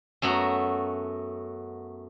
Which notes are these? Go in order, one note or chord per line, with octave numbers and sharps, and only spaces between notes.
F#2 A3 B3 F#4 A#5